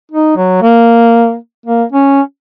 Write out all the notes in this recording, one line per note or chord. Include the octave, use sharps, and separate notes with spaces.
D#4
F#3
A#3
A#3
C#4